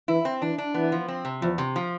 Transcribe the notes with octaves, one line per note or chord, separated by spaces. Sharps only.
E3 E4
C4
E3 D4
D4
E3 B3
F3
C4
C3
E2 F3
C3
F3